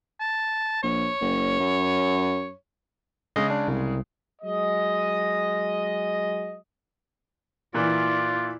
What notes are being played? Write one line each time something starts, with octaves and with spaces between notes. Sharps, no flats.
A5
A#1 C#5
F#1
F#2
C#3 G#3 G#4 D#5
D4
C2
F#3 G#3 D#5
A#2 E3 E4 F4 D5